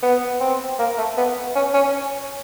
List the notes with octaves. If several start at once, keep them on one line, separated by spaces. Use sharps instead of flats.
B3
C4
A#3
A3
B3
C#4
C#4